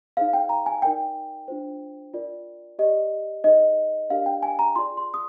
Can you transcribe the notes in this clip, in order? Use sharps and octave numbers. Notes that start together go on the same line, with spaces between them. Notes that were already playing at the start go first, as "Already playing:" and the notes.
D#4 G#4 C5 F5
G5
A#5
G#5
D#4 A#4 D5 G5
D4 F4 C5
F4 A#4 D5
G4 D5 D#5
D#4 G#4 C5 D#5
D4 G4 A#4 D5 F5
G5
G#5
A#5
F4 G#4 D5 C6
C6
D#6